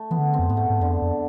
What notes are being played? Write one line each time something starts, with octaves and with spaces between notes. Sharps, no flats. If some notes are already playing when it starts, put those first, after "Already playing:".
Already playing: A3
E3 B3
D3
C4
F2
G#2 B3
A3
G#2
F2 D3
F2